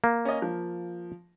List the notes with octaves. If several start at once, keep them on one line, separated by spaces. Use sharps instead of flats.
A#3
C#4 D#5
F3